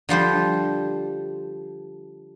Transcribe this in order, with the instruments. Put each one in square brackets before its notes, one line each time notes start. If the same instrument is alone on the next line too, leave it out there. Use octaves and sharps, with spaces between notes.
[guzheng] D3 F3 G3 C5